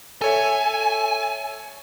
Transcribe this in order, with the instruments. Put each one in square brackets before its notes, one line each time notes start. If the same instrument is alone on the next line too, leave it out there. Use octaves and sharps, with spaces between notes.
[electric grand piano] A4 C#5 E5 [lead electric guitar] G#5